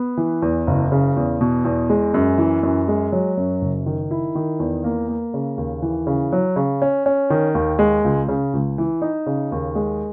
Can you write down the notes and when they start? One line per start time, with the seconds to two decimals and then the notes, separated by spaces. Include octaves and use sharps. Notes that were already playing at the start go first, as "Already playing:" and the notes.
Already playing: B3
0.17 E3
0.42 E2
0.67 F#1
0.92 C#3
1.16 E2
1.41 B2
1.65 E2
1.90 G#3
2.14 F#2
2.38 E3
2.63 F#2
2.88 G#3
3.12 F#3
3.37 F#2
3.61 F#1
3.86 D#3
4.11 E4
4.35 D#3
4.60 E2
4.84 A#3
5.09 A#3
5.34 C#3
5.58 D#2
5.82 E3
6.07 C#3
6.32 F#3
6.56 C#3
6.82 C#4
7.06 C#4
7.30 D#3
7.55 D#2
7.79 G#3
8.05 C#2
8.28 C#3
8.53 C#2
8.78 E3
9.02 D#4
9.26 C#3
9.52 D#2
9.75 G#3